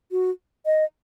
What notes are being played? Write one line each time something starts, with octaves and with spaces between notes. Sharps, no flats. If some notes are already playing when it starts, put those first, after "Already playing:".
F#4
D#5